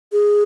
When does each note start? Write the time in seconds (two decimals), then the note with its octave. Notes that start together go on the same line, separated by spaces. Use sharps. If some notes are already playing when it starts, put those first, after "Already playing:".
0.12 G#4